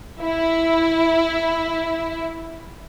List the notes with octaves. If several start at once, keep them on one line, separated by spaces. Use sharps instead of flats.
E4 E5